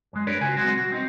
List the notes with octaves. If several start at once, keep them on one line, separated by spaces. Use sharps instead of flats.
F#2 G#3
D4 G4 A#4 B4 C#5 D5
C#3 F4 F#4 G#5
B1 G#3 B3 C4 F#4
F#4
G3 C4 D#4